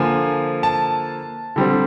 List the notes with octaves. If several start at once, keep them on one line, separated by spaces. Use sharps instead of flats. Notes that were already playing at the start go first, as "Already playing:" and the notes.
Already playing: D3 F3 A#3 G#5
A5
D3 G3 C4